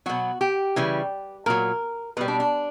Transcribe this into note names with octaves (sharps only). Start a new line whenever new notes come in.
B2 F#3 F#4
G4
C#3 E3 G3
A#2 F#3 A#4
B2 G3 B4
D4
D4